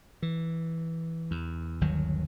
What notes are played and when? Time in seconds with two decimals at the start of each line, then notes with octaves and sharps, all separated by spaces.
0.22 E3
1.31 E2
1.81 G1 D#2 D#3 F#3